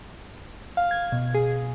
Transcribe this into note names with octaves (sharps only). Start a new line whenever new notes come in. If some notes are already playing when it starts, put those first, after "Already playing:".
F5
G#6
B2
G#4